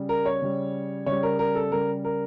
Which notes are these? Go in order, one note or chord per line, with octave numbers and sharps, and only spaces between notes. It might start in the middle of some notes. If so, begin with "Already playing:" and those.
Already playing: C#3 G3
A#4
C#5
C#3 G3
C#3 G3 C#5
A#4
A#4
A4
C#3 G3 A#4
A#4